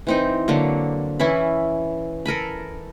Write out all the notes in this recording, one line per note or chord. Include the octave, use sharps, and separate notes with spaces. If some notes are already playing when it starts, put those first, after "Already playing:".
E3 C4 D#4
D3 F#3 A#3
E3 C#4 E4 B5
A4 A#4 G#5 B5